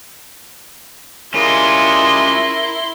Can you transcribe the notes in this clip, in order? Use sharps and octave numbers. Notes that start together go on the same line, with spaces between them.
G3 G#3 C#4 E4 F4 A#4 C6